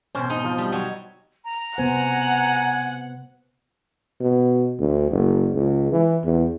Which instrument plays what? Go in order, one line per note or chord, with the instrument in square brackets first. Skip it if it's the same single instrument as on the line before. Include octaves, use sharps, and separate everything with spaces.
[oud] E2 B2 C4 [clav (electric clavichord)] C#4 [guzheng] C5
[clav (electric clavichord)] G#2 [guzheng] D#4
[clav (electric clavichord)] F3
[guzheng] G3
F#3
[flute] A#5
[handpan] C3 B3 C5 [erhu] F#5 [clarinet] G#5
[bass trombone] B2
D2
F#1
C#2
E3
E2